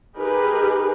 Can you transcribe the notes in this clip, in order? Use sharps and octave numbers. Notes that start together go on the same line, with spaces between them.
D#4 G4 G#4 A#4 B4